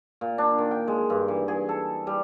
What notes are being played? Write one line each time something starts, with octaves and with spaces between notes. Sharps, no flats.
A#2
D4
D#3
G5
G#3
G2
E3
G#4
A4
G3